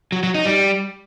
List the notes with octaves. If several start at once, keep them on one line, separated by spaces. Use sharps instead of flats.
F#3
F#3
D#4
G3